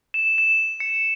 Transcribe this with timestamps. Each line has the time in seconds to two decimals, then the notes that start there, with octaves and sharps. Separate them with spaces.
0.14 E7
0.38 E7
0.80 C#7